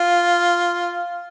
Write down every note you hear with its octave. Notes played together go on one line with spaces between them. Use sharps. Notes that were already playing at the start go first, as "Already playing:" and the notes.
Already playing: F4